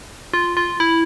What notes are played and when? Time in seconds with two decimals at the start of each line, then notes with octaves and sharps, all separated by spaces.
0.33 F4
0.57 F4
0.80 E4